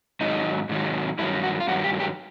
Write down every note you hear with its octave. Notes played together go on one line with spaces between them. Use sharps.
G#2 D#3 F#3 D#4
G#2 D#3 F#3
G2 D#3 F#3 E4
F#4
F4
G2 D#3 F#3 F#4
G4
G4